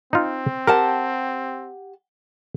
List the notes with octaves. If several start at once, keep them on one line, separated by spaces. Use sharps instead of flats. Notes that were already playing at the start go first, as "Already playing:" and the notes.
C4 D#4 F4
G4 A#4 F#5 A5